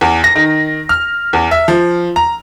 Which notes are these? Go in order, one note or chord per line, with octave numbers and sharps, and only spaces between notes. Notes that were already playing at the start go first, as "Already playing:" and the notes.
E2
A#6
D#3
F6
E2
E5
F3
A#5